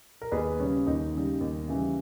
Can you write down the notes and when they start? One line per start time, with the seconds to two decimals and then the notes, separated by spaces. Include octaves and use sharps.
0.22 A#4
0.32 D#2 G#4 B4
0.60 C#3 G3 C#4
0.87 D#2 D#4
1.14 C#3 G3
1.41 D#2
1.68 C#3 E3 G3